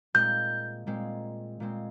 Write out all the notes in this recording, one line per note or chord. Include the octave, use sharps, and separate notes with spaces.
A#2 G#3 C4 G6
A#2 G#3 C4
A#2 G#3 C4